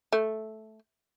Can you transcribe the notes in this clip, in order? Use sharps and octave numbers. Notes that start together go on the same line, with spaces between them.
A3